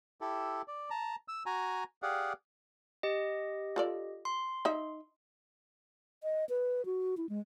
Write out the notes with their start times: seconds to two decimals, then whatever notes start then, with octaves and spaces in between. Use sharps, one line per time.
0.21 E4 G4 A4
0.68 D5
0.90 A5 A#5
1.28 E6
1.46 F#4 G#5 A#5
2.03 G4 G#4 D5 F5 F#5
3.03 G4 D#5
3.76 F4 A4 D5
4.25 C6
4.65 D#4 E5
6.23 D#5
6.49 B4
6.85 F#4
7.17 E4
7.29 G#3